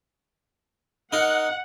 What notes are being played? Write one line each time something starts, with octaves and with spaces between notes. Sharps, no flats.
D#4 A#4 F#5